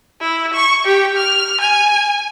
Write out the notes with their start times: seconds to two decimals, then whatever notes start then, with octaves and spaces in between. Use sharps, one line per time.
0.21 E4
0.54 C#6
0.85 G4
1.17 F6
1.61 G#5